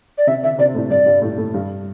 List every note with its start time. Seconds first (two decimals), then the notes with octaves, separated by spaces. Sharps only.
0.18 D5
0.27 C3 C4 E5
0.43 D3 D4 E5
0.58 C3 C4 D5
0.74 A2 A3
0.90 G2 G3 D5
1.06 G2 G3
1.22 A2 A3
1.38 A2 A3
1.54 G2 G3